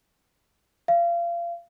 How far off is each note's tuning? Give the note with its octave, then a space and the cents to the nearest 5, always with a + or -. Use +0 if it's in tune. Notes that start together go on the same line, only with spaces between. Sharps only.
F5 -30